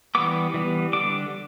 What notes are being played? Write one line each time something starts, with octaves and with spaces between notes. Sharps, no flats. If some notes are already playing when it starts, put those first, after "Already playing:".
E3 G3 B3 D6
E3 G3 B3
D3 G3 D4 D6